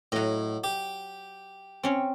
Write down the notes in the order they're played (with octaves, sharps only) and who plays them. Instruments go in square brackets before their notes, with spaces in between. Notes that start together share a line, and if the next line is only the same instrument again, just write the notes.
[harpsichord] A2 [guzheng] F#3 D#5
[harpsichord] G4
[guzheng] C4 C#4 C#5